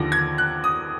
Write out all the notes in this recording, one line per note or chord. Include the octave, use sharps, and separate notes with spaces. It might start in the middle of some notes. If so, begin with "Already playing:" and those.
Already playing: D#2 D3 F3 A#6
G#6
F#6
D#6